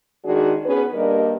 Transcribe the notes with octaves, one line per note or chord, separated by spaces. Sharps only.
D#3 G#3 D4 F#4 G#4 D5
B3 C#4 G#4 B4
G2 G3 A#3 D4 A#4 D#5